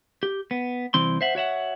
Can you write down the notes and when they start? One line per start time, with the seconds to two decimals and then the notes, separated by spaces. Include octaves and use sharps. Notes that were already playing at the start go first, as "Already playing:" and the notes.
0.23 G4
0.51 B3
0.94 C2 E3 C4 C6
1.21 C5 E5 F#5
1.35 F#4 C#5 E5 F#5